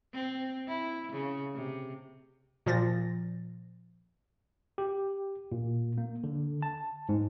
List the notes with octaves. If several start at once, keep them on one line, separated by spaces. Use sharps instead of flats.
C4
E4
C#3
C3
A#2 F3 A6 A#6
G4
A#2
A#3
D3
A5
G#2